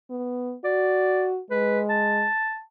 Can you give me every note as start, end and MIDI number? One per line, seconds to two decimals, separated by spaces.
0.10 0.55 59
0.64 1.40 66
0.64 1.26 74
1.51 2.27 56
1.51 1.80 71
1.89 2.61 81